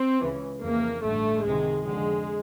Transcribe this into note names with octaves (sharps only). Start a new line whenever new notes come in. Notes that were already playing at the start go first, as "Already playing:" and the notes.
Already playing: C4
C#2 C#3 E3
F2 C#3 E3 A#3
A1 G2 D3 A3
C#2 C3 D#3 G#3
F2 D3 G#3